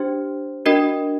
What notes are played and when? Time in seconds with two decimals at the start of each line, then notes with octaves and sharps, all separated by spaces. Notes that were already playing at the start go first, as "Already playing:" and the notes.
Already playing: D4 G4 C5
0.66 D4 F#4 A#4 D#5